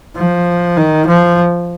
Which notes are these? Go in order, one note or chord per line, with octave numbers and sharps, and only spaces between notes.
F3
D#3
F3